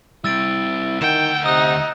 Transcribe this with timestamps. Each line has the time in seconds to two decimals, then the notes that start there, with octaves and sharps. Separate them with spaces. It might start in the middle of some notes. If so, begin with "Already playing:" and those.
0.24 G3 C4 E4 E6 A6 D7
1.01 D2 D#3 F#5 G5 E7
1.46 C3 D#4 D#6 F#6